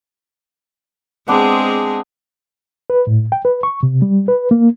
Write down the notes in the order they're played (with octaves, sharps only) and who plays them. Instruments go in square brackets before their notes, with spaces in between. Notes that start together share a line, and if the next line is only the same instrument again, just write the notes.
[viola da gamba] G#3 C4 G#4 [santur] B3 D4 D6
[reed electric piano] B4
A2
G5
B4
C#6
C3
G3
B4
A#3